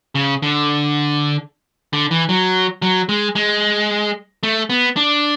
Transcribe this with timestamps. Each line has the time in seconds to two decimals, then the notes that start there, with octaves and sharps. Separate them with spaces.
0.15 C#3
0.42 D3
1.93 D3
2.11 E3
2.29 F#3
2.82 F#3
3.09 G#3
3.35 G#3
4.43 A3
4.70 B3
4.97 D4